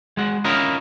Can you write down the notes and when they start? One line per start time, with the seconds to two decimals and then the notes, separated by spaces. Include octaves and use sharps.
0.17 G#3 F#4
0.45 C#4 E4 F4 A#4 D#5